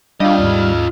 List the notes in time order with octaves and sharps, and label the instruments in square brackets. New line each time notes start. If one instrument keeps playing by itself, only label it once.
[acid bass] G3 [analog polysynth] D4 F5 [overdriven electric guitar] F4 D#5
[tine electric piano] D#2 G#2 [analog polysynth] F6